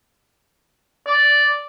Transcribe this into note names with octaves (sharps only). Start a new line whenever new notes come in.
D5